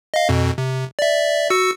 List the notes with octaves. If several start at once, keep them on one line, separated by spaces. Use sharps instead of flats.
D#5 F5
F2 B2
C3
D5 E5
F#4 E6 C#7